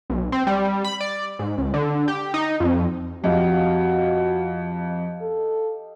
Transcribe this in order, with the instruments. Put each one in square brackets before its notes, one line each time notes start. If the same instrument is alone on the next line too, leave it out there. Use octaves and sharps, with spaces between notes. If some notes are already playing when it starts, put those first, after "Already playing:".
[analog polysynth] B1
C4
G3
B5
D5
G#2
C#2
D3
G4
D#4
F2
[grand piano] F2 [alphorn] F#4 [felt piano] G4 D#5 F5
[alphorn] A4